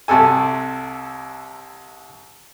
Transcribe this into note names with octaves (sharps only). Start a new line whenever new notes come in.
C2 C3 A4 G#5